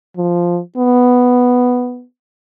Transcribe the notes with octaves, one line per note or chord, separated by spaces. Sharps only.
F3
B3